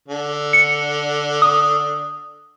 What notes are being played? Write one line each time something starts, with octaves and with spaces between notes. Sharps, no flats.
D3
C#7
D#6